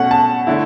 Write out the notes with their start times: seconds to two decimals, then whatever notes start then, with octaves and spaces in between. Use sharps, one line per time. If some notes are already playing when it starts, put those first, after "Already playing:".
Already playing: B2 A3 C#4 F#5
0.11 A5
0.47 D3 A3 E4